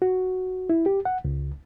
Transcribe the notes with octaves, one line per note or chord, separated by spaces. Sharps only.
F#4
E4
G4
F#5
C#2